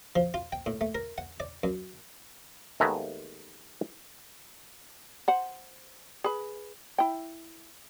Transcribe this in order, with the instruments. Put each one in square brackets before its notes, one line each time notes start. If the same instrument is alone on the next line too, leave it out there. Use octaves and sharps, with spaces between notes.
[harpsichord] F3
F4
G5
A2
A3
A#4
F#5
D5
F#2
[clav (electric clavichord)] D#2 G#3 A3 B3 E5 A#5
[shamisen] C5 F#5
G#4 B4
E4 G5